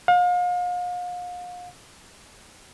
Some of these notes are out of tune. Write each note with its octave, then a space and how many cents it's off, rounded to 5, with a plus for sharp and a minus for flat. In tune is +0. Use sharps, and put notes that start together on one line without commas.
F5 +40